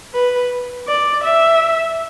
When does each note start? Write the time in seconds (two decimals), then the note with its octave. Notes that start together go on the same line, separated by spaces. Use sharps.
0.14 B4
0.88 D5
1.24 E5